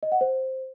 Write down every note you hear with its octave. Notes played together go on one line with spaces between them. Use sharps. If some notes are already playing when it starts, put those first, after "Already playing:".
D#5
F#5
C5